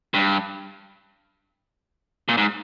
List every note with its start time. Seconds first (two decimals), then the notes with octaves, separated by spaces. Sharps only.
0.14 G2
2.29 A#2
2.37 G#2